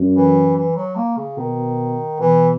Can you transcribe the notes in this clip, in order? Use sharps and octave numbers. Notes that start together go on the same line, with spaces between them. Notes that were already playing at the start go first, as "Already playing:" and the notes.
Already playing: F#2
E3
E3
F#3
A#3
C#3
B2 D#3
B2 E3